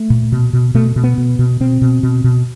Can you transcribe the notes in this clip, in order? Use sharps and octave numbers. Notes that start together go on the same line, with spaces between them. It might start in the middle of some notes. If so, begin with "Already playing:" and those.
Already playing: A3
A#2
B2
B2
B2 A3
B2
B3
B2
B2
B2 C4
B2
B2
B2